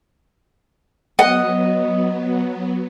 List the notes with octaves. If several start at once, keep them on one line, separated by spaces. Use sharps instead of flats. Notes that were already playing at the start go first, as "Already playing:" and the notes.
F#3 B3 D#5 F#5